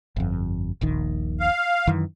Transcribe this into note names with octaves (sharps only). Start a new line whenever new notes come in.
G1 F2
D#1 A#1 D#3
F5
F#2 D#3 E3